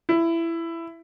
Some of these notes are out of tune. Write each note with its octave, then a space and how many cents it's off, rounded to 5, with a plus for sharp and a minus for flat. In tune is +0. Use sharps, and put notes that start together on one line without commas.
E4 +15